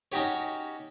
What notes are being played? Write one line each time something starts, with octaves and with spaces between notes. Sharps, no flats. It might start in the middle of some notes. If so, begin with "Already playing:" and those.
C#4 D#4 F#4 G4 C#5